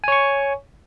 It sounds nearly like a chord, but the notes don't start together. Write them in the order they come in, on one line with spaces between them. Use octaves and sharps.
G#5 C#5 C#6